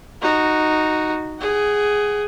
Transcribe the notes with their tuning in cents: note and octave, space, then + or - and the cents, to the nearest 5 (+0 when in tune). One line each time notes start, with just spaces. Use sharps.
D#4 -5 F#4 +0
G#4 +0 F#5 +35